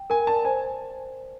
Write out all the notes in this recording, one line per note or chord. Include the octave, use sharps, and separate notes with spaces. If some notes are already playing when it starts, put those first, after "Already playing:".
Already playing: G5
A#4 G#5
D5 A5
C5 G#5